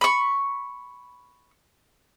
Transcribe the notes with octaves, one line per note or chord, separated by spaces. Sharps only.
B5 C#6